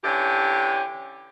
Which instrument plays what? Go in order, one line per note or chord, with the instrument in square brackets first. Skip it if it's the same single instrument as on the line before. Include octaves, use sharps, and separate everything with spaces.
[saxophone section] D3 E3 C#4 G4